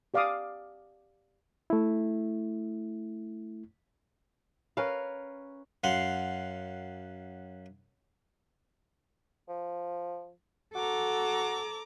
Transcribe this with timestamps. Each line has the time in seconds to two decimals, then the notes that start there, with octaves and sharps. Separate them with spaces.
0.14 G4 D5 F5 G#5 D6 D#6
1.70 A3 E4
4.77 C#4 A#4 B4 F5
5.84 F#2 F5 F#5 C6
9.48 F3
10.75 F#4 A4 A#5 D6